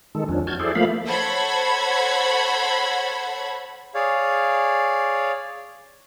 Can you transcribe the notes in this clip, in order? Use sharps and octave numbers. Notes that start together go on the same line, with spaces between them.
D#3 G#3 A4
F2 F3 C#4 D4
F#4 A5 F6 G6 G#6
E4 G#4 A4 C5 D5
F3 A3 A#3 F5 B5
A4 C5 C#5 F#5 B5 G#6
G#4 C#5 D5 F5